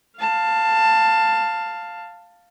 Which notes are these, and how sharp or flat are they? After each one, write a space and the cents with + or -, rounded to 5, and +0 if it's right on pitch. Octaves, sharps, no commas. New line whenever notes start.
F5 +0 A5 +15